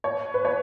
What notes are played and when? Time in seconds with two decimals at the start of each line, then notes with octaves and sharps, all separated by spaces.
0.04 C#5
0.34 B4
0.45 C#5